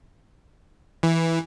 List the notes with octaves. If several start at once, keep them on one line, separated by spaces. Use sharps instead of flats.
E3